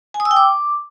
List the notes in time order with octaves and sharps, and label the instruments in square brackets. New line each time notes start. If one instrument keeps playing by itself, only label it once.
[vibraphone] G#5
D#6
E6
G5
D6